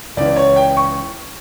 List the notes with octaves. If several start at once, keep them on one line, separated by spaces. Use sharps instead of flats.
C#2 C#3 E3 D5
C#5
G5
C#6